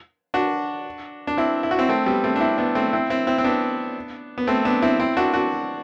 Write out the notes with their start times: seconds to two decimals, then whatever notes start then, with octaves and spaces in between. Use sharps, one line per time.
0.34 D4 F#4
1.27 D4
1.37 C4 E4
1.63 E4
1.71 F#4
1.78 C4 E4
1.89 A3 C4
2.06 G3 B3
2.24 A3 C4
2.36 D4
2.41 C4 E4
2.58 B3 D4
2.75 A3 C4
2.93 C4 E4
3.10 C4 E4
3.27 C4 E4
3.38 C4
3.44 B3 D4
4.38 B3
4.47 A3 C4
4.65 B3 D4
4.82 C4 E4
5.00 C4 E4
5.17 D4 F#4
5.34 D4 F#4